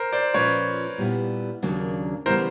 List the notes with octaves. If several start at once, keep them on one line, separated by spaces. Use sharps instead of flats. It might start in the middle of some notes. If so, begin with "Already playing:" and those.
Already playing: A#4 C5
C5 D5
A#2 F3 A#3 C#4 F4 B4 C#5
A#2 G3 B3 E4
D#2 C#3 F#3 A#3 D4
C#3 E3 G3 B3 E4 A#4 C5